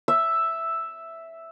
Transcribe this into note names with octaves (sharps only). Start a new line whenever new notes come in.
E5